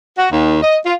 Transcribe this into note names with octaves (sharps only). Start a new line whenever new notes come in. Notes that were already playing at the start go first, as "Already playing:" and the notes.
F#4
D#2
D#5
F4